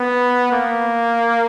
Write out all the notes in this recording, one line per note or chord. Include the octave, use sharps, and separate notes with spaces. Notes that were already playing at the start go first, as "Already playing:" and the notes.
Already playing: B3
A#3